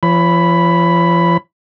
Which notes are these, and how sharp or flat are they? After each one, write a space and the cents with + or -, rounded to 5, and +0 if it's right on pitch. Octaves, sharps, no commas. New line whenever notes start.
F3 -35 C#5 +20 B5 +5